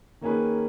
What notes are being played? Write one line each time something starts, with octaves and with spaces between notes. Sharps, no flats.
D#3 A#3 C#4 G#4 B4